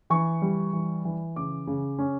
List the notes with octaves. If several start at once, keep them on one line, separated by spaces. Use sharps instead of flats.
E3 C#6
G3
E3
E3
C#3 D6
C#3
C#4